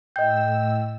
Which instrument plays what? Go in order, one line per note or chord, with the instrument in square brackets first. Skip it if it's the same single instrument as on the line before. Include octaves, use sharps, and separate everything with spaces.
[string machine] A2 E6 [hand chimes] D#5 G6 [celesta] G5